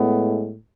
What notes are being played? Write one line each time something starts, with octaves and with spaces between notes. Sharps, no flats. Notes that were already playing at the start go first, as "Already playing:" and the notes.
Already playing: A2 G#3 B3